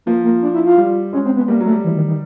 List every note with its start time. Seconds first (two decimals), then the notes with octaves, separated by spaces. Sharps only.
0.06 F3 A#3
0.24 A#3
0.42 D4
0.54 E4
0.66 F4
0.77 G3
1.13 G#3 C#4
1.25 C4
1.37 B3
1.48 G3 A#3
1.61 F#3 A3
1.72 G3
1.84 E3
1.96 D#3
2.08 D#3